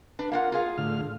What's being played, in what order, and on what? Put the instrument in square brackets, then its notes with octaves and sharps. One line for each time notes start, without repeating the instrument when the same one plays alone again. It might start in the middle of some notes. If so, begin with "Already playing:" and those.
[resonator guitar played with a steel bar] D4 [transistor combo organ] B4
[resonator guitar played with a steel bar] A#3 F4 F#5 [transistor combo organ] A#4
[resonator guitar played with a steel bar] F4 G#4 F5
[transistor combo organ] A2 D3 F6